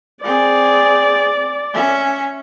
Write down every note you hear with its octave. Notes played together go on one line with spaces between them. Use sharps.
C4 G#4 D5
C#4 E5